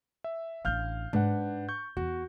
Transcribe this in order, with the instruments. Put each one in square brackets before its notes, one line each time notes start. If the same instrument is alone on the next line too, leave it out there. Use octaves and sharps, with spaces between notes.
[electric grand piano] E5
[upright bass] A1 D4 [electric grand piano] F5 F6 G6
[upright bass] G#2 [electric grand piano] D4 B4 F#5
[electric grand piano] C#6 G6
[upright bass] E2 [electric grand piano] F#4